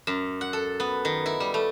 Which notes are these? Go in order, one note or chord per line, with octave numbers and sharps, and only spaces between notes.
F#2
F#5
A4
B3
D#3
E4
G3
A3